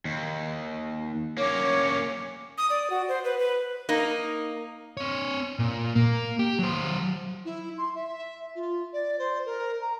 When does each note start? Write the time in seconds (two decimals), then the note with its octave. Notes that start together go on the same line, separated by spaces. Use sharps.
0.05 D#2
1.38 A#3 C#4 C#5 D6
2.58 D#6
2.70 D5
2.90 F#4
3.08 C5
3.24 B4
3.39 B4
3.89 A#3 D#4
4.97 C4 C#5
5.59 A#2
5.95 A#3
6.39 G4
6.59 F#3 C5
7.45 E4
7.78 C6
7.95 E5
8.55 F4
8.93 D5
9.19 C5
9.46 A#4
9.81 A#5